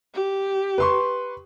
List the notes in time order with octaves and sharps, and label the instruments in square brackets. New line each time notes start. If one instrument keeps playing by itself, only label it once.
[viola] G4
[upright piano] B4 C6 C#6